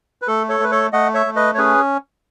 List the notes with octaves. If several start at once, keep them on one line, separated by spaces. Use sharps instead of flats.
B4
A3 A4
A4 C#5
A3 B4
A4 C#5
A3 D#5 F#5
C#5 E5
A3
B4 D#5
C#5
C#4 G#4 B4